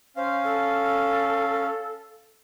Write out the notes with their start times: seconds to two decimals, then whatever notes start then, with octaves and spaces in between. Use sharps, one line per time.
0.16 C#4 C5 F5
0.44 A4